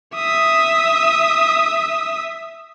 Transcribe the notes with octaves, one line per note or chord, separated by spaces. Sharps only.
E5 D#6